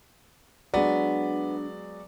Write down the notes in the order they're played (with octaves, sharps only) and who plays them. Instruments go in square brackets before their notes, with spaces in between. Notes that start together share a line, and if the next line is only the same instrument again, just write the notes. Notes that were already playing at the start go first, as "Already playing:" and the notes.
[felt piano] F#3 G#3 [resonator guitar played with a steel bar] B3 [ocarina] D4 [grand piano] D5